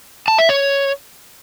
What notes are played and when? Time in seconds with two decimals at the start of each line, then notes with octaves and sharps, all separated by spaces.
0.28 A5
0.39 E5
0.49 C#5